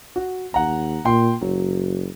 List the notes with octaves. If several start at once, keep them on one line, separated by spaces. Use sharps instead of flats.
F#4
D#2 F#5 A#5
A#2 G5 C6
F#1 F#3